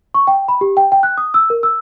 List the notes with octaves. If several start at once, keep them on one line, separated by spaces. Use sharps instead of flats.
C#6
G5
B5
G4
G5
G5
F#6
D#6
E6
A#4
E6